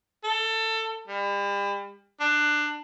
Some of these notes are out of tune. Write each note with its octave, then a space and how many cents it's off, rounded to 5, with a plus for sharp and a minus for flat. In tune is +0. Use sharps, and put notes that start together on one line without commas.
A4 +20
G3 +40
D4 +20